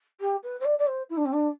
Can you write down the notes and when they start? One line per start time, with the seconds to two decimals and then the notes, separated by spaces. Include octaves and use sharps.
0.20 G4
0.43 B4
0.60 C5
0.65 D5
0.78 D5
0.87 C5
1.09 E4
1.17 D4
1.25 C4
1.32 D4